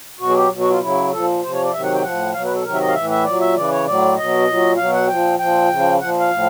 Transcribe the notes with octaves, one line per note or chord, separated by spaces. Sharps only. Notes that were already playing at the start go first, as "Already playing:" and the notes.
B2 F#3 F#4
G#4
G4
B2 F#3
F#4
F4
C#3 F#3 E4
A#2 F3 A4
C3 F3 C5
C#5
D5
C3 D#3 F#3 E5
F#5
G5
A2 F3 F#5
B2 F#3 F5
B4
A4
C3 D#3 F#3 A#4
E5
D#5
F5
A2 E3 E5
E5
A#2 F#3 D5
E5
C#3 E3 D5
C#5
A2 F#3 D5
B2 F#3 D#5
A#2 F#3
B2 F#3 F5
F#5
A#2 F3 G5
A#2 F3 G5
C#3 F3
A#2 F3 F#5
F5
A2 F3